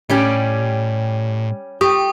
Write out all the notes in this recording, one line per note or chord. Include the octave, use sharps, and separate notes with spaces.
A2 G3 C#4 G4
G4 C#6 D#6